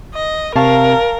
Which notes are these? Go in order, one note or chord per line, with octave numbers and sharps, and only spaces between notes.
D#5
C3 A#4 F5 A5 C#6